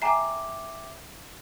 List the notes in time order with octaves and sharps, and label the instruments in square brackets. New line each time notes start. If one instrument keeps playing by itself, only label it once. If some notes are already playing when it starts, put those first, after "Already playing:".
[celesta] E5 G5 D6 [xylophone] G#5 A#5 C7